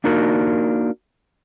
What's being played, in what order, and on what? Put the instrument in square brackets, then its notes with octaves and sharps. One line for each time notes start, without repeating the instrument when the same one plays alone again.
[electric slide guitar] A#3 D4 D#4 F#4 A#4